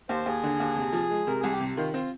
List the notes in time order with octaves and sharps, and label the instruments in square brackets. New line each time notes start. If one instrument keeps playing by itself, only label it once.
[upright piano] D#2 [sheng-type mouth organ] C5
[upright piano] D#2 [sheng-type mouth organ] G#4
[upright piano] D3
D#2
C3
F3
G#3
[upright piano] C3 [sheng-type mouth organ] A#4
[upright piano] C2 [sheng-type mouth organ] G#4
[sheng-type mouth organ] G4
[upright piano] C3
[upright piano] D#3 [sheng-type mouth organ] F4
[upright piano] C4 [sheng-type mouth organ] F4